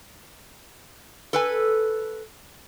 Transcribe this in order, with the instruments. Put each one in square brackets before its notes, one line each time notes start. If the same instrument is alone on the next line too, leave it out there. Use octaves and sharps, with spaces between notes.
[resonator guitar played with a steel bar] A4 B4 G#5